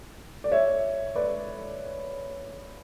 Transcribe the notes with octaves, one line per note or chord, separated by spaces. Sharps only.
D5
C#5 E5
B4 D5